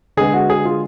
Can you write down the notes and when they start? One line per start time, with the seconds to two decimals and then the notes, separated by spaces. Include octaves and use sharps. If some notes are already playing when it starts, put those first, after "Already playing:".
0.17 D3 G#3 B3 G#4
0.34 F#4
0.50 G#4
0.65 F4